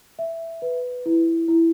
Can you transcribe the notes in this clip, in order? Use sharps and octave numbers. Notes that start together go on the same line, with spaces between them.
E5
B4
E4
E4